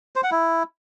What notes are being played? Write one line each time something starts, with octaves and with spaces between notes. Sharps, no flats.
C5
F#5
E4